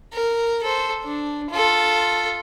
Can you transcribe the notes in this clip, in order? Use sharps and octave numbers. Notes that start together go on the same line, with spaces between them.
A#4
A4 C5
D4
F4 A4